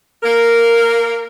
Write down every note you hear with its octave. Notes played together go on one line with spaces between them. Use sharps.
A#3 A#4